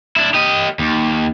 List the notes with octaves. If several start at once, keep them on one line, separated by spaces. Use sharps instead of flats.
D4 E4
G4 D#5
D#2